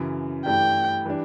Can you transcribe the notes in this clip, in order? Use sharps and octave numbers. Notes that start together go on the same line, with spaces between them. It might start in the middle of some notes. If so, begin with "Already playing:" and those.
Already playing: F#2 C#3 E3
G2 E3 A3 E4 G4 G5
E3 G3 D4